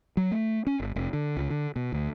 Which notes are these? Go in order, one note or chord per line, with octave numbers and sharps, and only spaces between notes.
F#3
A3
C#4
G1
F1
D3
C#2
D3
B2
D2